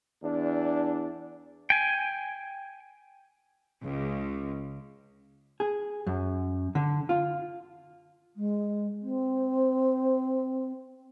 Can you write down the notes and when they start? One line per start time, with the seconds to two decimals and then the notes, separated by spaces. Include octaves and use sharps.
0.23 E2 D4
1.70 G5 G#5
3.82 C#2
5.60 G#4
6.07 F#2
6.75 D3
7.09 F4
8.35 G#3
9.02 C4